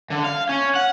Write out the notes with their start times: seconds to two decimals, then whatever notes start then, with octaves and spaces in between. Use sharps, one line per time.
0.10 D3
0.24 F5
0.49 C#4
0.75 F#5